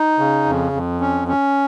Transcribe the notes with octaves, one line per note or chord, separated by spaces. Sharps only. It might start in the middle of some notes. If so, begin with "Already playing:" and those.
Already playing: D#4
C#3
F2
F2
C#4
C#4